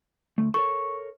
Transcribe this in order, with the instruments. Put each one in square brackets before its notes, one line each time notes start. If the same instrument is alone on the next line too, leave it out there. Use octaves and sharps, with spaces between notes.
[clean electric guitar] D2 A3
[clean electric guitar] A4 A#4 C#5 [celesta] C#6